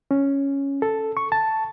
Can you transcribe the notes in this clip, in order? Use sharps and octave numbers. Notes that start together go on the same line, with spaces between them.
C#4
A4
C#6
A5